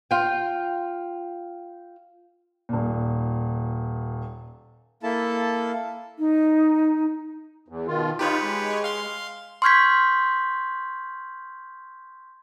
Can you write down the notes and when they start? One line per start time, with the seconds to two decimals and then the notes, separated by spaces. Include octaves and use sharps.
0.11 F4 G5
2.69 D#1 A#2
5.03 A#3 E4 A4 A5
6.19 D#4
7.68 E2
7.87 B2 D#3 F4
8.19 D#4 F4 G4 B4 C#5
8.42 G#3
8.84 F5 C6
9.62 C6 C#6 F6 G6 G#6 B6